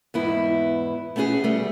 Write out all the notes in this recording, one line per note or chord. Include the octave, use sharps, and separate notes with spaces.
E2 G#2 B3 E4
A3 B3 C#4 F#4 G#4
G3 A3